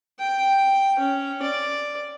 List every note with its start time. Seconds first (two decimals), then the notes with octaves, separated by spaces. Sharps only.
0.19 G5
0.99 C#4
1.42 D5